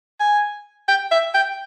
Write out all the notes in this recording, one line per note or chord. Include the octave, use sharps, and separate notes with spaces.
G#5
G5
E5
G5